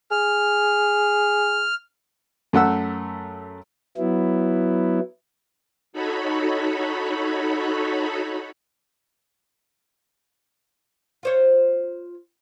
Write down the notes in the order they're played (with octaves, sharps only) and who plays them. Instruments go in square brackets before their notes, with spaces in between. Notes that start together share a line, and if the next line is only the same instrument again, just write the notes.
[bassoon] G#4 [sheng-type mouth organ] F6
[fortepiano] F#2 A3 F#5 E6
[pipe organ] F#3 B3 E4
[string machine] D#4 F#4 A4 C#5 B5
[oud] F4 C5 C#5